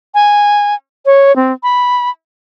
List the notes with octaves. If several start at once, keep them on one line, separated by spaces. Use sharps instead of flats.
G#5
C#5
C4
B5